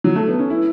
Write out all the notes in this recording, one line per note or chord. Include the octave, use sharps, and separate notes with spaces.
F#3
A3
B3
C#4
E4